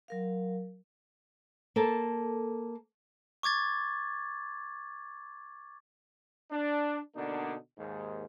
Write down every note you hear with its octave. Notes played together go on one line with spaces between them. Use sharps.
F#3 A#4 F5
A#3 A4 A5
C#6 D6 G#6 A6
D4
B2 D3 A#3 D4 D#4
D#2 G#2